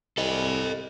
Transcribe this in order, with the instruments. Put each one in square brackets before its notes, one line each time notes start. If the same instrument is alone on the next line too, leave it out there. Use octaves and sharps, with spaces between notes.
[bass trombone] C2 [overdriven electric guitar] A4 D#5